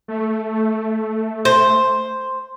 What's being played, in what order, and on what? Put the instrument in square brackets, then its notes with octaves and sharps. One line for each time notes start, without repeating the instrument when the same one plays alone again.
[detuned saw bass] A3
[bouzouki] C5